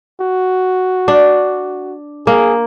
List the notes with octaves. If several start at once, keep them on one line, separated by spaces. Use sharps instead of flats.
F#4
D4
A#3 G#4